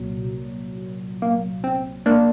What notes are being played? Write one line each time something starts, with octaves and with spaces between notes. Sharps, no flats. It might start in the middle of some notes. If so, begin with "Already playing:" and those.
Already playing: C2 A#2 F#3
A#3
C4
A#3 D4